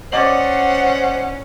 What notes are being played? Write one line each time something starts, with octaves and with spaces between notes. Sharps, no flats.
C#4 C5 D5 D#5 F#5 F#7